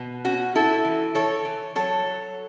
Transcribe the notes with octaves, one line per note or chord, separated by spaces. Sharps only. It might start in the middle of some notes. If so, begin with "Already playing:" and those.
Already playing: B2 B3
C#4 F#4
C#4 E4 A4
E3
E3 A4 C#5
E3
F#3 A4 C#5
F#3